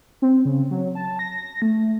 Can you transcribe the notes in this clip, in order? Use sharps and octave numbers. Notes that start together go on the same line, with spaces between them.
C4
C#3
F#3
A5
A#6
A3